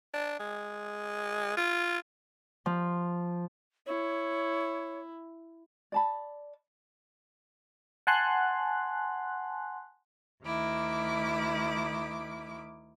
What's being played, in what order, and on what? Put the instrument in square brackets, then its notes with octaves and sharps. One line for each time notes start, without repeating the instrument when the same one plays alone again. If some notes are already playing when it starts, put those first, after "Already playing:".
[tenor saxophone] D4
G#3
F4
[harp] F3
[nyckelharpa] E4 [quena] C#5
[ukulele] D5 A5 B5
[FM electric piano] F#5 G#5 A5 C6 F#6
[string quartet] D2 D#3 E4 D6